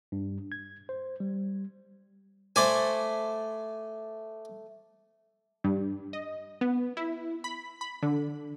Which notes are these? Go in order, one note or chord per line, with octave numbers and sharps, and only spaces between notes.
G2
G#6
C5
G3
A3 C5 D5 G#5
G2
D#5
B3
E4
B5
B5
D3